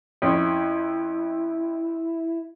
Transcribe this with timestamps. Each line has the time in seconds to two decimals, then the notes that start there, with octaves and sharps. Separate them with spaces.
0.22 F2 C#4 E4